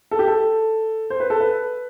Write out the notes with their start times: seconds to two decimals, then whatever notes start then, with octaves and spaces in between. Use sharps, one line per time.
0.11 A4
0.19 G4
0.28 A4
1.10 C5
1.20 B4
1.30 A4
1.41 B4